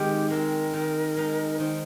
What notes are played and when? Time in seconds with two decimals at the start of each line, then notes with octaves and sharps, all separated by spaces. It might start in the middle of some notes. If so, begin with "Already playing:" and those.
Already playing: D#3 G#3 C4 G4
0.30 G#3 C4 A#4
0.74 D#3
1.16 G#3 D#4
1.60 D#3 C5